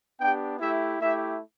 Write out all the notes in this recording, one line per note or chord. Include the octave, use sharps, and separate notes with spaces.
B3 D4 G4 G5
A3 E4 G4 E5
A3 E4 G4 E5